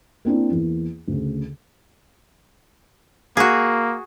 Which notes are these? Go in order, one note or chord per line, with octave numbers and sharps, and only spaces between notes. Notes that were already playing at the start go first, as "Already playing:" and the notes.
A#3 C4 D4 E4
E2 E3 A#3
D2 C#3
A#3 F#4 G#4